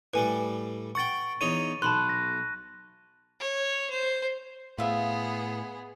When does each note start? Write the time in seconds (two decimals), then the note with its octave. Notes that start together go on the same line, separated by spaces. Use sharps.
0.14 A2 G3 B4 G#5
0.95 F#5 G5 C#6 A6
1.41 E2 D#4 C#5 D#7
1.82 B1 A5 B5 C6 F#6
2.09 A#6
3.40 C#5
3.90 C5
4.78 A2 B3 F4 G#4 C5 E5